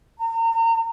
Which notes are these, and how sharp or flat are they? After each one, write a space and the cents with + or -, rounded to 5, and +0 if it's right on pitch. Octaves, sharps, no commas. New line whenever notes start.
A#5 -35